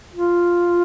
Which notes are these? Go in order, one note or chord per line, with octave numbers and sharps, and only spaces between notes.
F4